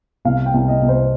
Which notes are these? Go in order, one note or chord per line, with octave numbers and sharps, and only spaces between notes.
C2 F5
G5
C2
D#5
C2
C5